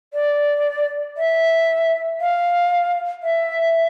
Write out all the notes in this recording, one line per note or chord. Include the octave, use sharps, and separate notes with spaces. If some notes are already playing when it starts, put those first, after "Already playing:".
D5
E5
F5
E5